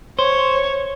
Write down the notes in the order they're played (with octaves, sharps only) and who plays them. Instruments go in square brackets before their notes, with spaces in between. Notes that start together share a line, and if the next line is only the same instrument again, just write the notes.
[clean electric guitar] C5 [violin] C#5